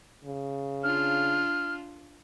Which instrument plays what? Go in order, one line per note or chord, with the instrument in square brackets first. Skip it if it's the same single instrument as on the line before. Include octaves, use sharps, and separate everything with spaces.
[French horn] C#3
[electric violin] D4 F4 [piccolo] F6